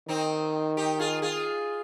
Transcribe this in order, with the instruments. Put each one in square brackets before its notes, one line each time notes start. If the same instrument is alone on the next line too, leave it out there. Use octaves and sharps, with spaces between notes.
[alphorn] D#3 [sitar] C4 D#4
[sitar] D#4 G4
F4 G#4
F4 G#4